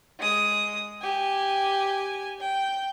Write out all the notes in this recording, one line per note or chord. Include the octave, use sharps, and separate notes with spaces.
G#3 D#6
G4 G#5
G5